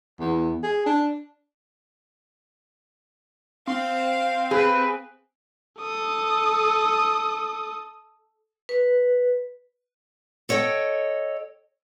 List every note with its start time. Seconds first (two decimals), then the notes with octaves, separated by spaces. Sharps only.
0.20 E2
0.63 G#4
0.86 D4
3.67 C4 F5
4.51 G#4 B4
5.80 A4 D#6
8.69 B4
10.49 A4 C#5 D#5 F#5 G5